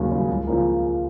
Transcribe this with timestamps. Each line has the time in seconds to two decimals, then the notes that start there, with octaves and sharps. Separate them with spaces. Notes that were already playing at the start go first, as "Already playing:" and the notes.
Already playing: D#2 C#3 F#3
0.11 C#3 F#3
0.28 C#2
0.47 C#3 F3 A#3